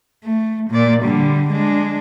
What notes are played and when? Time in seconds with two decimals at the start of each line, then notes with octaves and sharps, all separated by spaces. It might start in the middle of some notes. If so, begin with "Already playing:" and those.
0.24 A3
0.70 A#2 D5
1.03 D3 G3
1.50 G#3 D4